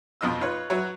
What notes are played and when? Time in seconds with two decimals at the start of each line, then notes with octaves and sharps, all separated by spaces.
0.21 F2 B2 F3 F4 D#5 E6
0.41 D#4 F4 B4 C#5
0.70 F#3 F#4 B4 C#5 E5